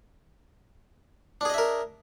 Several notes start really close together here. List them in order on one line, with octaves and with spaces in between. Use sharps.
D4 G#4 D#5 E5 A#4